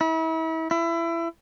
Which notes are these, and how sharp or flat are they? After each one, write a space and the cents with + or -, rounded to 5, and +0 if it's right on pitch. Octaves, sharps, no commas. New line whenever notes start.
E4 -35
E4 +25